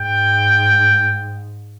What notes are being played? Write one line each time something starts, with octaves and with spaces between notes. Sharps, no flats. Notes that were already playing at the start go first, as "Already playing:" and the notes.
Already playing: G#2 G5